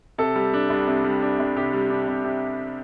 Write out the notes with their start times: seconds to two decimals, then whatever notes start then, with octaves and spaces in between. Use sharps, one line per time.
0.18 C3 A4
0.36 G3
0.54 D4
0.70 C2
0.88 C3
1.05 G3
1.22 D4
1.39 C2
1.57 C3 G4
1.73 G3
1.90 D4
2.08 C2
2.24 C3